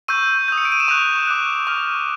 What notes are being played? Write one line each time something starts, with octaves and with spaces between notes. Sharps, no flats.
C#6 E6 G6 D#7
D#6 G6
C#7
D7
D#7
E7
C#6 F#6 F7
D6 F#6
C#6 F6 F7